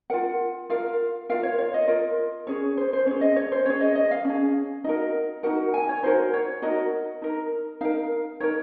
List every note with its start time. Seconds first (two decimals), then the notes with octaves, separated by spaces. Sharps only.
0.10 F4 A#4 F#5
0.70 F4 A#4 F5
1.29 F4 A#4 F5
1.43 C#5
1.58 C#5
1.74 D#5
1.88 F4 A#4
2.47 C#4 G#4 C#5
2.77 C5
2.93 C5
3.06 C#4 G#4 C#5
3.21 D#5
3.36 C#5
3.52 C5
3.66 C#4 G#4 C#5
3.80 D#5
3.95 D#5
4.11 F5
4.25 C#4 G#4
4.84 D#4 F#4 A#4 D#5
5.43 D#4 F#4 A#4 F#5
5.74 G#5
5.89 C#5
6.03 D#4 F#4 A#4 C5
6.34 C#5
6.62 D#4 F#4 A#4 D#5
7.22 D#4 A#4
7.81 D#4 A#4 F5
8.40 D#4 A#4 C#5